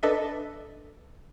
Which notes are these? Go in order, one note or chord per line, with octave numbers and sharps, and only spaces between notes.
D4 A4 B4 D#5 E5